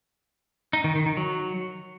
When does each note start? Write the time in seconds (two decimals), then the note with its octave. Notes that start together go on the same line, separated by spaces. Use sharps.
0.73 D#4
0.84 D#3
0.95 D#3
1.06 D#3
1.17 F#3